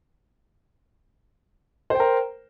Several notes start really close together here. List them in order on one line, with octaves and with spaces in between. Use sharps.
C5 G5 A#4